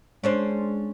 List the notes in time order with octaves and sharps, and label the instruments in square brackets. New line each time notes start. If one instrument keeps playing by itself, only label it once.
[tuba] G#3 [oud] C#4 D4 C5